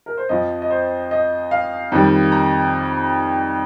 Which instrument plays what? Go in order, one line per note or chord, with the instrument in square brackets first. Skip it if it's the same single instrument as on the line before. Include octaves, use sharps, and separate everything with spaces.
[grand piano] A#4
C5
F2 F3 D#5
D#5
C5
D#5
F5
F2 D#3 G3
A#5